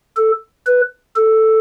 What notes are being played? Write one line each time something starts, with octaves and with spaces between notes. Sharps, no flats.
A4
B4
A4